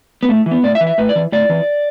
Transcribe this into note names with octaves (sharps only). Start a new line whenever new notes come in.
B3
A2 A3
E3
B3
A2 D5
E5
E3
E5
A2 B4
D5
E3
A2 D5
E3